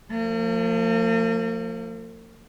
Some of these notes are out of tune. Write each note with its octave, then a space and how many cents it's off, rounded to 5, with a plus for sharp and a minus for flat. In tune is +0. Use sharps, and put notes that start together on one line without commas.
F3 +15 A#3 -45